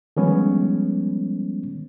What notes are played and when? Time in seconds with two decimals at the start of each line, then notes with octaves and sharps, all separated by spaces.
0.17 D#3 F3 G3 G#3 B3 C#4